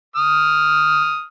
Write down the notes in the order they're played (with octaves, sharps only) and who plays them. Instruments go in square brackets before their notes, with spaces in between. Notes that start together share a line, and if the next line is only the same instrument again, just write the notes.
[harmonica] D#6 F6